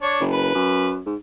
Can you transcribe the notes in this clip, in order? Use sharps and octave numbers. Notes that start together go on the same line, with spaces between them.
D4 C#5
F#1
B4
F#2
G#2